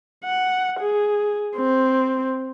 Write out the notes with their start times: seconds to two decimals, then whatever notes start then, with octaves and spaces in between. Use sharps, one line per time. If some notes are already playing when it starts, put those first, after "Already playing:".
0.24 F#5
0.80 G#4
1.56 C4